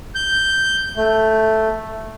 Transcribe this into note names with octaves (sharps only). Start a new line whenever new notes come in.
G6
A3